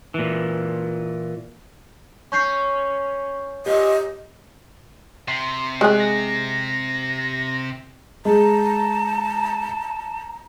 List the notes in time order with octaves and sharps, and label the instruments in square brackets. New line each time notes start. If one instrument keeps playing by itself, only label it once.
[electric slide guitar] A#2 E3
[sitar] C#4 [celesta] C#6 G6 C7
[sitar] A#2 [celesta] G4 [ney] D#5
[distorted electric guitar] C3 [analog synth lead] C6
[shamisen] G#3 G#4 [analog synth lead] F#6
[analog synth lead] A#6
[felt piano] G#3 [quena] A5 [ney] A#5